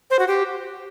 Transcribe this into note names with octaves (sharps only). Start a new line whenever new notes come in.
C5
F#4
G4